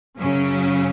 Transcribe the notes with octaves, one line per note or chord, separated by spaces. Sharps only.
F#2 C#3 F#3 C#4